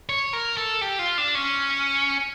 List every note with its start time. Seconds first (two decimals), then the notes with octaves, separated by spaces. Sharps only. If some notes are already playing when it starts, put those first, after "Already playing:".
0.09 C#5
0.33 A#4
0.57 A4
0.81 G4
0.99 F4
1.18 D4
1.35 C#4